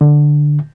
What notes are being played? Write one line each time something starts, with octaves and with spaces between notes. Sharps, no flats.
D3